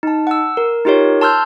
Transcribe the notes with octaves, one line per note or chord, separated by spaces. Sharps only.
D#4 A5
F#5 E6
A#4
D#4 F4 G4 A#4 C#5
A5 C6 E6 F6 G6